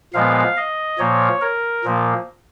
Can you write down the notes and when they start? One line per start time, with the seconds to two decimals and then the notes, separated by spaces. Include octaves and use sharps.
0.14 A#2 F3 G#3 B3 F5
0.57 D#5
0.99 A#2 F3 A#3 C#5
1.41 A#4
1.84 A#2 F3 A#3